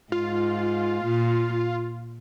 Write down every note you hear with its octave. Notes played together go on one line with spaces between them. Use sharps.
G#2 F4
A#2